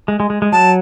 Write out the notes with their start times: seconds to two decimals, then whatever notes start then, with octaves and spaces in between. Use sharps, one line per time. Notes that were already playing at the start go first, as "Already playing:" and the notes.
0.08 G#3
0.20 G#3
0.30 G#3
0.42 G#3
0.52 F#3 A5